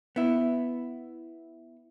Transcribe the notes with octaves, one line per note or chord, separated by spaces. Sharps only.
B3 E4